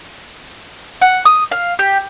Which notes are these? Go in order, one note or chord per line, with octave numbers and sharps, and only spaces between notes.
F#5
D#6
F5
G4